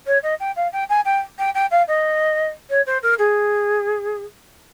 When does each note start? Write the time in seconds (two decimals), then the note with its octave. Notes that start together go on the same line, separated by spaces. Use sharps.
0.06 C#5
0.23 D#5
0.40 G5
0.56 F5
0.72 G5
0.89 G#5
1.05 G5
1.38 G5
1.54 G5
1.71 F5
1.88 D#5
2.69 C#5
2.86 C5
3.02 A#4
3.18 G#4